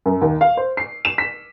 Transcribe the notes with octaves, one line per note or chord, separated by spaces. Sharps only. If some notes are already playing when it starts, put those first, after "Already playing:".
F#2
D#2
F5
C5
C7
E7
B6